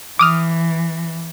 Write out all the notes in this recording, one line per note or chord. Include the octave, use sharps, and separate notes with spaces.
E3 D6 D#6 F6